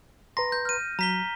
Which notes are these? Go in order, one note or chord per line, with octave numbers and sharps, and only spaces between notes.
B4 A#5 C6 A#6
G6
F6 D#7
F#3 A#5 B6 G7